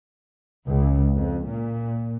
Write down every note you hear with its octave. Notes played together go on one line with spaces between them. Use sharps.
C#2
F2
A#2